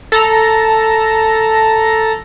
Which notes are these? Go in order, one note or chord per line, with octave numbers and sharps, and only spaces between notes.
A4 A#5